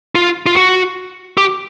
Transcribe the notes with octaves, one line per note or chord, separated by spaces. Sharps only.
F4
F4
F#4
G4